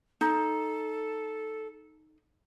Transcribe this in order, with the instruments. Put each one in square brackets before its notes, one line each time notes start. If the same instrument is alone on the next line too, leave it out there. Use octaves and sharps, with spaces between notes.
[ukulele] D#4 [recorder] A4